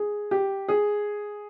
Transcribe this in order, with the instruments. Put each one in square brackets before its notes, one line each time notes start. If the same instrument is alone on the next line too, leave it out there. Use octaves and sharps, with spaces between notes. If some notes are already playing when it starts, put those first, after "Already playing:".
Already playing: [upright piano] G#4
G4
G#4